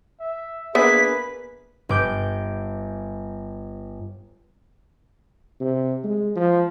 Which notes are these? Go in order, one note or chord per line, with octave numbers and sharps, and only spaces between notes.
E5
A#3 B3 D4 G#4 B4 E5 B6
G1 D6 G6
C3
G#3
F3